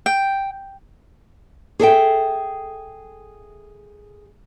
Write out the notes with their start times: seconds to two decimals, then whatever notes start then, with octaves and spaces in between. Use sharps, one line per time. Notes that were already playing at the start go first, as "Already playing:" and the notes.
0.06 G5
1.80 G#4 A4 E5 G5